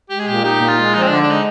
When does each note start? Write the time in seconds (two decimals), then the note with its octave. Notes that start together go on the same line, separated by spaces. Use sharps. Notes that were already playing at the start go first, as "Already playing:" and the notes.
0.10 G#3 G4
0.20 G#4
0.27 A#2 G4
0.43 D#4 G4
0.60 A#2
0.68 F4
0.77 G#3
0.93 F3 D#4
1.02 C4
1.07 D3 D4
1.23 D4
1.27 G#3 D#4